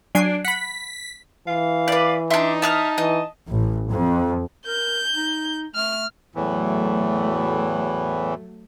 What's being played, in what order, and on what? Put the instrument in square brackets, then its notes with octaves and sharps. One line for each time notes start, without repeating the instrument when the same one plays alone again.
[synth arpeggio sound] F#3 G#5 C7 [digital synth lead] D4
[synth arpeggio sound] F#5 B5 [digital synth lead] B6
[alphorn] E3 [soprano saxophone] F5
[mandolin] B4 D5
[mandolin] D4 C6 [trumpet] D#4 [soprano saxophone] E5
[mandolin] E5 D#6 F6 [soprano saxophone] A5
[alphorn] E3 [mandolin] D#5
[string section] A1
F2
[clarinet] A#4 [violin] G6
[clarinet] D#4
[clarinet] A3 [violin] F6
[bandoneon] E2 A2 E3 [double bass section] F#3 A3